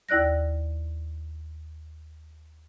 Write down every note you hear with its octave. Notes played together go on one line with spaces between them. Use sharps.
D#2 E4 D5 F#6 A#6